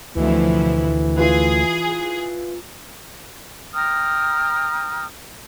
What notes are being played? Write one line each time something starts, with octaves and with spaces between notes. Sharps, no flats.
D2 B2 E3 F3 E4
E4 F4 G#4 B4
G5 A#5 D#6 F6